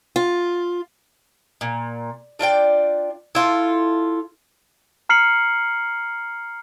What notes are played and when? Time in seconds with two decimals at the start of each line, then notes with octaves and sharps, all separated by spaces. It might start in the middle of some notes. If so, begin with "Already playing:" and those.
0.16 F4
1.61 A#2
2.39 D4 F4 D5 G5
3.35 E4 F4 A4
5.09 A#5 F6 C7 C#7 F#7